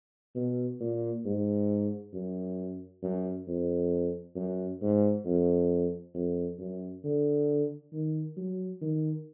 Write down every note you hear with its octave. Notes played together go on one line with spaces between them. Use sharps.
B2
A#2
G#2
F#2
F#2
F2
F#2
G#2
F2
F2
F#2
D3
D#3
F#3
D#3